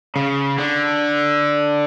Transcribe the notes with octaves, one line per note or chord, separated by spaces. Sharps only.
C#3
D3